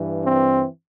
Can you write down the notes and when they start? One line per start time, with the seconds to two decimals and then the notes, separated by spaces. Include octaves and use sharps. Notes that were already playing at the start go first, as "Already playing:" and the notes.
Already playing: G2 E3
0.24 C4